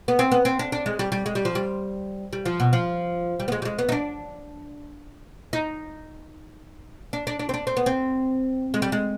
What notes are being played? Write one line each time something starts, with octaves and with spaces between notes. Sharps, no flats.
B3
C4
B3
C4
D4
D4
G#3
G3
G3
G#3
G3
F3
G3
G3
F3
B2
F3
G3
B3
G#3
G3
G#3
B3
D#4
D4
D#4
D4
D4
D4
C4
D4
C4
B3
C4
G#3
G3
G#3